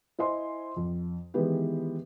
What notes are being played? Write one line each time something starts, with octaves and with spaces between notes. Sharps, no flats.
E4 C5 D#5 G#5 C6
F2
D#3 E3 G#3 B3 G4 B4